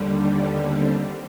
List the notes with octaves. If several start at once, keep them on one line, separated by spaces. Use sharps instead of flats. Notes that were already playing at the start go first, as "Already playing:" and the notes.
Already playing: D#2 D3 G3
B3
C4